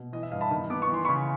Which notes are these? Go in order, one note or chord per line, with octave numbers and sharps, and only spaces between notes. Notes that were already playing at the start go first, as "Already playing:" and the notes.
Already playing: B2
E3 D#5
E5
G2 D#5 F5
A5 B5
D#3
B3 D6
C#6
E3 C6
C#3 B5 C#6